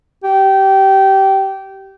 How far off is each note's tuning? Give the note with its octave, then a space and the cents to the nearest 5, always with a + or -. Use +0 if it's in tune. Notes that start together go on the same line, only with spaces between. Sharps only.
G4 -20